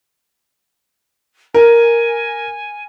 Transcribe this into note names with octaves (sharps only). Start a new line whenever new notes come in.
A#4 G#5